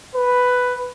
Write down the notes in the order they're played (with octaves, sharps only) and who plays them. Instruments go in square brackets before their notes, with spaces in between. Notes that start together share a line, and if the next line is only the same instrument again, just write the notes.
[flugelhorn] B4